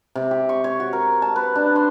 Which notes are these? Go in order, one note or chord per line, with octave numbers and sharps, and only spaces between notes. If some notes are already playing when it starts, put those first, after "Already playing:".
C3
G4
C#6
C#5
F#4
A#4
A5
B4
D4
C6